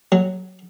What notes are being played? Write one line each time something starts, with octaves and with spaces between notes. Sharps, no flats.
F#3